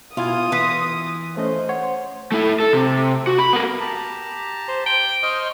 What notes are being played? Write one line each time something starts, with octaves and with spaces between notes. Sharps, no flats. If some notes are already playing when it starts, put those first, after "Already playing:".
B2 E4 F4 G#5 D#6
E3 B3 C6 B6 D#7
A3 C#4 C5 D#5
C#5 F#5
A3 E4
A4
C3
F#4
B5
B3 A#4
G4 A5 A#5
C5
G5
C5 D#5 C#6 F6